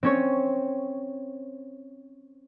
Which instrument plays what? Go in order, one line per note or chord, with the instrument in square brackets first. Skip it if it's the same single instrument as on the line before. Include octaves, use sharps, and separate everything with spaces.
[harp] C4 C#4 C#5